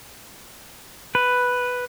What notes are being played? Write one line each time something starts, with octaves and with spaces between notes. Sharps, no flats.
B4